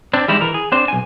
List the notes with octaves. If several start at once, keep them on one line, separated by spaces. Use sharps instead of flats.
C4 D4
E3 G3 G#3 D#4 E4
E3 A#4
G#4
C4 D4 C5
B1 G#5